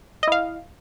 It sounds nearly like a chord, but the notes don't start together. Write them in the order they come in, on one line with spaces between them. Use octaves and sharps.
D#5 E4 F5